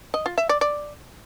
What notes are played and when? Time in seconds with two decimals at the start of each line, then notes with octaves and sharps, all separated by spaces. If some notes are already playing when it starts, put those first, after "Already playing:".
0.14 D#5
0.26 F4
0.38 E5
0.49 D5
0.61 D5